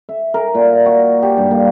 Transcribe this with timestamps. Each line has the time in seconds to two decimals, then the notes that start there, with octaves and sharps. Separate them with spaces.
0.09 E5
0.34 A#4
0.55 A#2
0.86 F#4
1.22 G4
1.37 G2
1.51 A#3